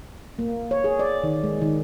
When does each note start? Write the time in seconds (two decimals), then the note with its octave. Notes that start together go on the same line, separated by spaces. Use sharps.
0.39 A#3
0.71 C#5
0.84 G#4
0.99 D5
1.24 D#3
1.44 G#3
1.62 D#3